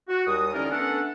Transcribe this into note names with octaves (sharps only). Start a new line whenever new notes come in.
F#4
D#2 G3 D#6
D3 E3 C#4 D#4 F4 A#4
A3 B3 C#4 D4 A4 F#5